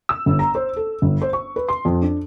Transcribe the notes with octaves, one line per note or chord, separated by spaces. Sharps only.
E6
G1
A#5
C5
A4
G1
C5
C#6
B4
C6
F2
D4